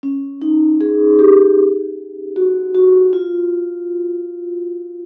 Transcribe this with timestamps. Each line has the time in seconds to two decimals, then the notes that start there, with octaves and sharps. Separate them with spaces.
0.03 C#4
0.42 D#4
0.81 G#4
1.19 G4
2.36 F#4
2.75 F#4
3.13 F4